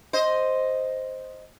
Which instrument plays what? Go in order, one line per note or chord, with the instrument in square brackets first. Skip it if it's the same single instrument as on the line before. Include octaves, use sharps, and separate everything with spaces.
[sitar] C5 D#5